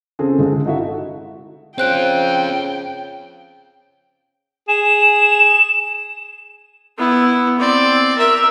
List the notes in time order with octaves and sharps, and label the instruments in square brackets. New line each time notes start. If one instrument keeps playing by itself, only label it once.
[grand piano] C#3 C4 C#4 G#4 A4
G1 G#3
D#4 E4 F#4 A4 E5
[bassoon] C#3 [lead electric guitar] C4 F4 [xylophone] C5 F#6 D7 [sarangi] G5
[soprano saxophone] G#4 [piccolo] E7
[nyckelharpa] B3 E4
C4 D5
A#4 E5